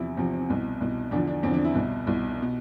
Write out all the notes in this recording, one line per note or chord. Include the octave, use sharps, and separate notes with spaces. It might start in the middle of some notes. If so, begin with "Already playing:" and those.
Already playing: E2 C3 F3 E4
E2 C3 F3 C4
C4
C2 B2
C2 B2
E2 D3 F3 D4
D4
E2 D3 F3 C4
D4
E4
C2 B2
C2 B2
B2